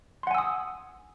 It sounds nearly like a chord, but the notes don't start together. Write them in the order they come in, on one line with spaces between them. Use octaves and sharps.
C6 F#5 G#5 E6 D#6